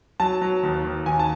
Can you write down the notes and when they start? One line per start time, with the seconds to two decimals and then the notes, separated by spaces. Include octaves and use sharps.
0.20 F#3 A5
0.41 F#3
0.63 D#2
0.85 D#2
1.06 D#2 G#5
1.19 A5